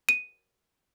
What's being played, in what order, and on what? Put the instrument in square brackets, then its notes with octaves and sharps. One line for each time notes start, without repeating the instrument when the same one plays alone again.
[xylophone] D#7